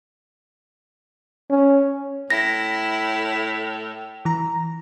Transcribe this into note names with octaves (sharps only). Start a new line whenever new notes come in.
C#4
A2 E4 A#6
E3 A#5